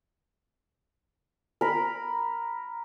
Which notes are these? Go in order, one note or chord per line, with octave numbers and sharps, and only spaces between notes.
A#4 B5